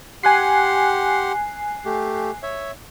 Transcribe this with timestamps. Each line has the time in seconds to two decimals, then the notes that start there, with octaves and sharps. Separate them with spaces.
0.23 G4 F#5 G#5 C6 F#6 C7
1.85 A3 G4
2.43 C#5 E5